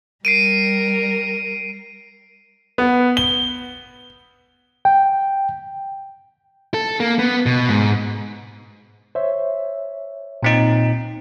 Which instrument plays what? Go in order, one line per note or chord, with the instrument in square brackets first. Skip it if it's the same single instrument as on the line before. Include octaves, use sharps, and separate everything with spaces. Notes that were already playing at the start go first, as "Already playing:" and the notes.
[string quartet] G3 A#4 [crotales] C7 D7 D#7
[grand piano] B3
G7
[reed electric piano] G5
[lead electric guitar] A4
A#3
B3
B2
G#2
[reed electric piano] C5 C#5 E5
[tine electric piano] A#2 C4 D#4